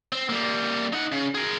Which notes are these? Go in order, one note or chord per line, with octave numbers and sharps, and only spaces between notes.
C4
G3 A#3
D#4 F#5
C#3
G#4 A#4